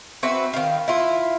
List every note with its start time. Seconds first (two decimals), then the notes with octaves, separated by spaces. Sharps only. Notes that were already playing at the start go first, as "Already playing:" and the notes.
0.23 C4 F#4 B4 E5
0.53 D#3 F5
0.88 E4 F4